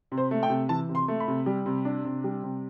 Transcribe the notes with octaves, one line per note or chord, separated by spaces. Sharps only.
C3
C5
A3
G5
C3
E3 A5
C3
C6
A3
B5
C3
G3
C3
D4
C3
G3
C3